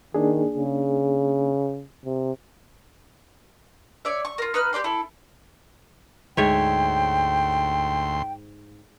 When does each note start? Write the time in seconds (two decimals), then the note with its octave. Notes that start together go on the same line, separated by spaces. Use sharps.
0.15 D#3 A#3 D4 G#4
0.56 C#3
2.05 C3
4.05 C#5 D5 E5
4.25 C#6
4.38 F4 A#4
4.54 D#4 B4 F6 F#6
4.73 G4 B4 D5 C6
4.84 E4 A4
6.37 D2 G#2 C#5 E5 G5 C6